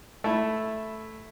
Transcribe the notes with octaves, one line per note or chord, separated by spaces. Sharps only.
A3 E4